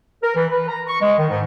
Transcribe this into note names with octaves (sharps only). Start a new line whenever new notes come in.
A#4
E3
B4
A#5
C#6
G#3
D#3
G#2